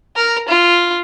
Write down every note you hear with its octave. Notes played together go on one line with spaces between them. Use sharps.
A#4
F4